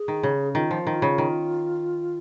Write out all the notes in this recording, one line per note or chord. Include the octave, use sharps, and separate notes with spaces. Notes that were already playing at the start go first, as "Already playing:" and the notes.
Already playing: G#4
D#3
C#3
D#3 F4
F3
D#3
C#3
D#3